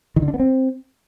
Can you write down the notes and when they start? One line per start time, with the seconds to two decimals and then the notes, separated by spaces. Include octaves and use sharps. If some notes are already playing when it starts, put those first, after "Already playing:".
0.16 D#3
0.22 D3
0.28 D4
0.34 B3
0.40 C4